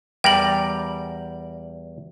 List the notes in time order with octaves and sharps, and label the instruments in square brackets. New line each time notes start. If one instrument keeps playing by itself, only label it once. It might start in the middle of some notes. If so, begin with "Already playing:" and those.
[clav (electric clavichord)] E2 G3 A#4 [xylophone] G5 F#7